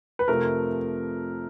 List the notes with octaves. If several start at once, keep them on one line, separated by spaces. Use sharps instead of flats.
B4
F2 C3 F3 A3 A#4